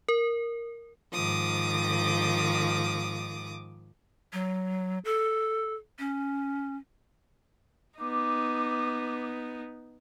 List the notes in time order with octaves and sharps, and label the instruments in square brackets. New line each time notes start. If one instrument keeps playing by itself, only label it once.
[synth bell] A#4
[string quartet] G#2 D#3 F3 D6 D#6
[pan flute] F#3
A4
C#4
[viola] B3 D#4 [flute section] D6